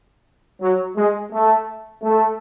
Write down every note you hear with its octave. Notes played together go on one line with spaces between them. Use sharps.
F#3
G#3
A3
A3